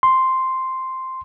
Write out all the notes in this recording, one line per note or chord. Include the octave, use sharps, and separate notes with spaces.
C6